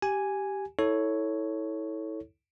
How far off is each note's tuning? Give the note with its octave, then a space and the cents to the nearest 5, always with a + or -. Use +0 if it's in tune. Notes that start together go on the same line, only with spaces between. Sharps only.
G4 -10 G#5 +0
E4 -30 A4 +0 C#5 +0